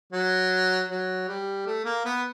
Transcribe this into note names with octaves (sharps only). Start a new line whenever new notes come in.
F#3
F#3
G3
A3
A#3
B3